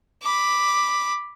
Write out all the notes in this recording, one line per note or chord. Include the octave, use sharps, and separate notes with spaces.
B5 D6